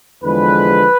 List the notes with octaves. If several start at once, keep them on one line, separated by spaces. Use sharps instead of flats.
E2 D3 F3 G#3 B4